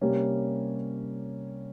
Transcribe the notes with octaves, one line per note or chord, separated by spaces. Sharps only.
C3 G3 A#3 C#4